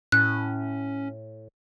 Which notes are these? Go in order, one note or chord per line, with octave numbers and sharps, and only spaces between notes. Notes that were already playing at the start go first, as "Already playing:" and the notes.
A2 C#4 F#6